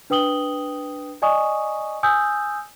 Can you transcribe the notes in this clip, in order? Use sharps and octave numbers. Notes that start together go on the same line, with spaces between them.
D4 B4 G5 D#6 F#7 G7
D5 D#5 G#5 C#6 D#6
G#5 D#6 E6 G6